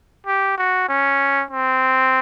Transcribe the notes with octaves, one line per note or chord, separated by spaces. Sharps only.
G4
F#4
C#4
C4